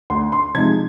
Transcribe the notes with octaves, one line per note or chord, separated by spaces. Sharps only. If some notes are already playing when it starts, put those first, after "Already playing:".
D2 C6
C6
C3 F3 G#3 D#4 G#6